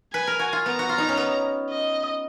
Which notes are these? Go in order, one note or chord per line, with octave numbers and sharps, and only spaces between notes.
B4 G#5
A#4
F#4
F4
B3 A#5
F#4
F4
D#4
C#4
B3
D#5